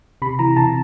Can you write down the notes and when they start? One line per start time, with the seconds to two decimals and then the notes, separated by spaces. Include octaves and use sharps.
0.22 C3 B5
0.39 E3 A#5
0.57 C3 A5